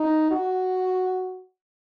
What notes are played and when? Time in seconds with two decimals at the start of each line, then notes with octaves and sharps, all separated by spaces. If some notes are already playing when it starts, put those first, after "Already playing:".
Already playing: D#4
0.31 F#4